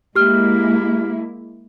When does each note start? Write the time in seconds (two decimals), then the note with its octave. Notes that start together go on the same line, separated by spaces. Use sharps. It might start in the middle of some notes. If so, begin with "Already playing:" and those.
0.16 G#3 A#3 E4 G4 F6